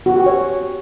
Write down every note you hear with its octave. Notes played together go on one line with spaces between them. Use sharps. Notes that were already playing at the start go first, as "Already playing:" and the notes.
F#4
G4
C#5